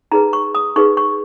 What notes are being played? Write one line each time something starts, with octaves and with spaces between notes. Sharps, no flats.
D#4 G#4 B4 A#5
C#6
D#6
D#4 G#4 B4 C#6
C#6